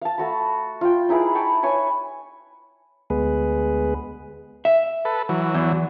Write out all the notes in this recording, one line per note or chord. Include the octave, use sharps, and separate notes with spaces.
F5 A5
A3 F#4 B5
F4 G5
D#4 E4 G#4 B4
G5 A5 C#6
B4 C#5 G#5 C#6
D2 G#3 B3 G#4 B4
E5
A4 B4
E3 F#3
E2